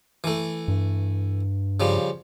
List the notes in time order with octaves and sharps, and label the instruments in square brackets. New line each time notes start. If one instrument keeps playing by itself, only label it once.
[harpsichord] E3 A3
[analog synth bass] G2
[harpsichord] C#3 F3 G3